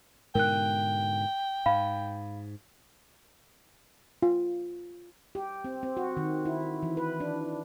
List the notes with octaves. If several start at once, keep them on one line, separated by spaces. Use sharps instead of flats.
G#2 B2 D3 A#4 G5 F#6
G#2 F5 B5
F4
G4
C4
C4
F#4
D#3
E4
E3
B4
D4